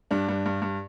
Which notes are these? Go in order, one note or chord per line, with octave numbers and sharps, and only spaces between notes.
G2 D4
G2
G2
G2